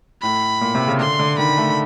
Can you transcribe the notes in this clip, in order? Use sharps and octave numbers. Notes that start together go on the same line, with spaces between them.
A2 B5
A#2
C3
C#3
D3 C6
D3
D#3 B5
A3